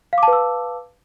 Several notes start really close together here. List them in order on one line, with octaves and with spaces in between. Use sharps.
F5 D6 A5 B4 E6